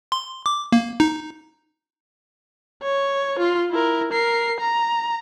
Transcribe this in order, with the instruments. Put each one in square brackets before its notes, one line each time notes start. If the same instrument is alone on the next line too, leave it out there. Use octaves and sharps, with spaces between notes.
[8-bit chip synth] C6
D6
A#3
D#4
[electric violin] C#5
F4 C6
E4 A#4
A#4 C7
A#5